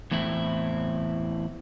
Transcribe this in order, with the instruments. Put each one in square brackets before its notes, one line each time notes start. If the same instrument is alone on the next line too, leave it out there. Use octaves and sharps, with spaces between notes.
[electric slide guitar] E2 A2 C4 E4